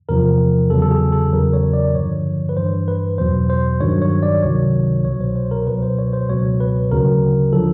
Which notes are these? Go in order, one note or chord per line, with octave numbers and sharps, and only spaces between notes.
E2 C3 F3 A#4
E2 C#3 F#3 A4
A4
G#4
A4
E2 C#3 F#3 A#4
C#5
D5
G2 D3 F3 C#5
B4
G2 E3 C5
B4
E2 B2 F#3 C5
C5
G2 D#3 F#3 C#5
C#5
D5
C#2 C3 D#3 F#3 C#5
C2 B2 F#3 C#5
C5
C5
A#4
C#2 B2 F#3 B4
C5
C#5
C5
C#2 B2 F#3 C#5
B4
D2 C#3 F#3 A#4
D3 F3 A4